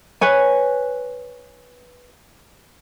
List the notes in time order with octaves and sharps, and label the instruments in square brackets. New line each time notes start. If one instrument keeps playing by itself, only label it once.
[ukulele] B4 C#5 G#5